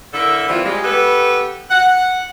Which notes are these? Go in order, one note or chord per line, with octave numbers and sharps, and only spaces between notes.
D3 E4 A4 A#4 E5
E3 G3 C4 E4 F4
G3 G#3
B3 G4 A4 B4
F#5